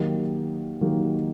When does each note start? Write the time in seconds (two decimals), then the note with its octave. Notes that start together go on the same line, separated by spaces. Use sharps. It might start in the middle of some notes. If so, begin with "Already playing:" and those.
Already playing: D#3 F#3 A#3 D#4 G4
0.81 D#3 F#3 A#3 D#4 G4